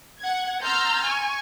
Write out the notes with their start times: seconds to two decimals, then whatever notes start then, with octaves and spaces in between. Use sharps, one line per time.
0.20 F#5 G#6
0.63 A#5 C6 E6 F6 G6 A6
1.06 G#5 C#6